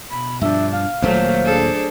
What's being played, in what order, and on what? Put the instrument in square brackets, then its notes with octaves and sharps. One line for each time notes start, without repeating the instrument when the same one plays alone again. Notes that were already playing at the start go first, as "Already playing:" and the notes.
[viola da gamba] B2 [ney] B5
[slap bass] G2 F3 [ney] D4 [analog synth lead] E5
[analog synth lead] F5
[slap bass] D#1 A#2 A#3 [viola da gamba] F#3 A3 [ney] C5
[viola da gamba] D4 G#4 A4